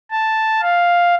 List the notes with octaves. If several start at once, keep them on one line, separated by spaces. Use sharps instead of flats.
A5
F5